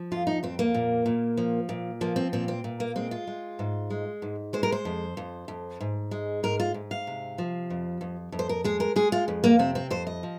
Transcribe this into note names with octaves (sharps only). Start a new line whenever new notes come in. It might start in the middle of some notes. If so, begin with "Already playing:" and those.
Already playing: F3
F2 F4
D#4
F2 C4
A#3
A#2
A#2
F3
A#2
F3 A#3
C4
A#2 C4
C4
A#2
A#3
G#3 C4
F4
G#3
G#2
G#3
G#2
G#3 C5
A#4
C5
F2
F2
F2
G#2
G#3
G#2 A#4
F4
G#2
F5
C3
F3
F2
F2
F2
C5
A#4
G#3 G#4
A#4
G#3 G#4
F4
F2
A#3
C3 C4
C4
F2 C5
D#5
F3